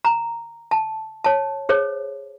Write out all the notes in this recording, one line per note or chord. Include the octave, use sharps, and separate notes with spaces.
A#5
A5
C#5 A5
G#4 C5 C#5